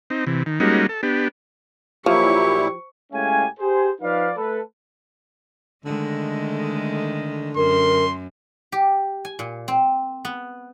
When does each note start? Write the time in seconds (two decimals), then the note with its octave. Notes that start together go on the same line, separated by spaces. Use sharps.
0.10 C4 D#4
0.27 C3 E3
0.46 D#3
0.60 G3 G#3 A#3 C#4 D#4 F#4
0.89 A4
1.03 B3 D4 G4
2.06 A#2 F3 F#3 E4 G4 C#6
3.13 A2 G#3 C#4 G4 F5 G#5
3.59 G4 G#4 C5
4.01 F3 D#4 B4 D5 F5
4.37 A3 A4 B4
5.85 D3 D#3 G#3 A3
7.57 F#2 A#4 C6
8.72 G4
9.25 G#5
9.39 A#2
9.68 C4
10.25 B3